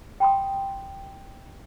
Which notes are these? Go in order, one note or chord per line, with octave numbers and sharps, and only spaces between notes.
G5 A5 B5 C6 D#6